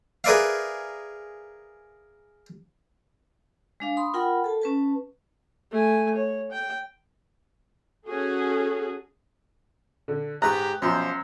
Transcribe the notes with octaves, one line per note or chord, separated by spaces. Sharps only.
G#4 A#4 B4 D5 E5 F5
G#3 D4 F5
B5 C6 D#6
F4 A#4 F#5 G5 B5
A4 A5
C#4 B4 A5
A3 G#5
C#5
G5
C#4 F#4 G#4 A4
D3
G#2 G4 B4 A#5 C#6 F#6
F#2 B2 F3 C5